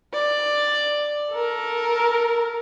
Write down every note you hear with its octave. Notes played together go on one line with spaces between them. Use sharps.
D5
A4 A#4